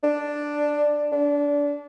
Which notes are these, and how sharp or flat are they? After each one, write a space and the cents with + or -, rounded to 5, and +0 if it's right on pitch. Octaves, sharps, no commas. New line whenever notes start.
D4 +5
D4 -25